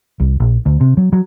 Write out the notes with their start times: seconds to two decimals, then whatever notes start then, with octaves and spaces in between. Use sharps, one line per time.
0.20 C2
0.40 A#1
0.66 D2
0.81 C3
0.97 F#3
1.13 F#3